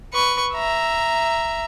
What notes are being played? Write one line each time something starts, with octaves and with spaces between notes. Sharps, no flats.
B4 C#6
E5 A#5